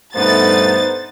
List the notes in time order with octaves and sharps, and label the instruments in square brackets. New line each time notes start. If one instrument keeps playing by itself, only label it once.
[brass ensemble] G2 B2 A3 [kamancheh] B3 D#4 [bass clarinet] C5 [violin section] A6